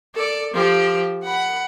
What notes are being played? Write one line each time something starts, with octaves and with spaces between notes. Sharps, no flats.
A4 D5
F3 G4
F#5 B5